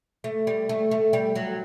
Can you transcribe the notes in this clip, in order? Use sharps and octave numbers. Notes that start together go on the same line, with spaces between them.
A3
G3
A3
A3
G3
F#3